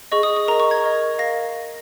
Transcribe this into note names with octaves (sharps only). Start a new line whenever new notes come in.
G#4 D#5 C#6
D#6
D#6
A#4 D#5 A#5
C#6
G#6
A#4 D#5
A#4 F5 A#6